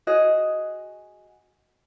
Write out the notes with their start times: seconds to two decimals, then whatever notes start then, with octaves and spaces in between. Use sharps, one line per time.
0.07 F#4 G#4 D#5